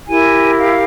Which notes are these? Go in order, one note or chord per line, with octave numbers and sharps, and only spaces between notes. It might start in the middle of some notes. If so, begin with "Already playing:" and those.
E4 G4 A#4 G#5
F5